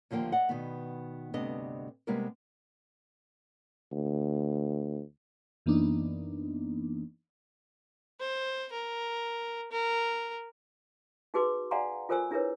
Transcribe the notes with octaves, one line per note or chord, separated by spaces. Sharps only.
D#2 D3 F3 A#3 G5
D5 D#5 F#5
B2 D#3 B3
D2 G2 C3 B3 D4 D#5
C3 G3 G#3 A#3 B3 A#4
D2
F#2 E3 A#3 B3 D4 D#4
C5
A#4
A#4
D#4 F#4 G#4 B4 C6 D6
D5 F5 F#5 G#5 A#5 C6
F4 A4 A#4 C5 G#5 E6
D4 E4 G#4 A#4 B4 C#5